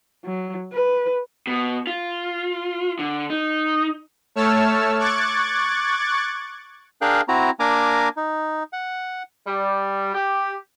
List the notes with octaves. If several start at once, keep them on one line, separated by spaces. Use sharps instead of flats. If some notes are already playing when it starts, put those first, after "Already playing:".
F#3
B4
B2
F4
D3
D#4
A3 C#5 A5 E6 F6
C#6 D6 F#6 G#6 A6
D4 G#4 A#4 F5 G5 F#6
C4 E4 F#4 A#5
A#3 D4 A#4 G#5 A#5 D6
D#4
F#5
G3
G4